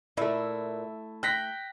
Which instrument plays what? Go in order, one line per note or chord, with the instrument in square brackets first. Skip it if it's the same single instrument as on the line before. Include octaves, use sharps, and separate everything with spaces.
[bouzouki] A#2 [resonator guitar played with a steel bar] A3 E4
[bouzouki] G5 [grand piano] F#6 A#6 B6